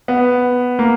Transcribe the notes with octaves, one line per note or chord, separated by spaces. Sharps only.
B3
A#3